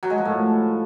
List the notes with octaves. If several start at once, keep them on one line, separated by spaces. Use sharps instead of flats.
F#3
G#3
F3
A2